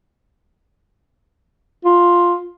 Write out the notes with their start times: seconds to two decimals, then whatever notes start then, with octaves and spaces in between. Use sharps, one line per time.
1.85 F4